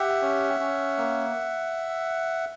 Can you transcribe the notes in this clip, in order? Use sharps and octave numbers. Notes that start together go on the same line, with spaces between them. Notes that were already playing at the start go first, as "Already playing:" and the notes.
Already playing: G4 E5 F#5
C#4
C#4
A#3